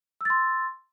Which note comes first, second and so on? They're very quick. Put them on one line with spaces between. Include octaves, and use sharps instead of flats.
E6 A6 C6